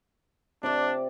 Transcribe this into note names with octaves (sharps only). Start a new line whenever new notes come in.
C3 D4 D5 D6